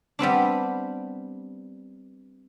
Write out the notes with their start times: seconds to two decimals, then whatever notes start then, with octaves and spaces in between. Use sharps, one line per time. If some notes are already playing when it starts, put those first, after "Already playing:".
0.19 G3 B3 C4 D4